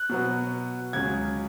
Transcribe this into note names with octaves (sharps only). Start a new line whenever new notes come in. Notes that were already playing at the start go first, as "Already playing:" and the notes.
Already playing: F#6
B2 F#3 B3
C#2 C#3 F#3 G#6